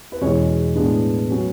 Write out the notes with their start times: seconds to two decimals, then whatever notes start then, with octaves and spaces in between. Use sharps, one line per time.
0.12 B4
0.21 E2 B2 G#3 C#4 C#5
0.76 A2 G#3 B3 D4 B4
1.30 F#3 C#4